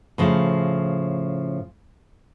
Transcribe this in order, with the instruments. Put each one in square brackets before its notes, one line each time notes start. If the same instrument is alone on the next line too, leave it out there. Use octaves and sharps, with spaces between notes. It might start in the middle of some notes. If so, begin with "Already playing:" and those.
[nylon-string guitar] A2 C#3 F3